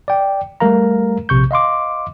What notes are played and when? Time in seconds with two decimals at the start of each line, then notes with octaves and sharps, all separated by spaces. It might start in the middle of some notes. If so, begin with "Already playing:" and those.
0.08 D5 G5
0.60 G3 A3 A#4 F5 A#5
1.29 A#1 C3 C#6 G6
1.51 D#5 F5 C6 D6